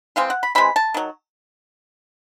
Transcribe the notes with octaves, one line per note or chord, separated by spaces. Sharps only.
E3 G#3 C4 F5
F#5
B5
E3 G#3 C4 B5
A5
D#3 F#3